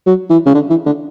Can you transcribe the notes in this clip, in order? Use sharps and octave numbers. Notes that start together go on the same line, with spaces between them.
F#3
E3
C#3
D3
E3
D3